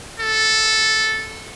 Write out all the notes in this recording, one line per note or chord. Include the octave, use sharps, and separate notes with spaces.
A4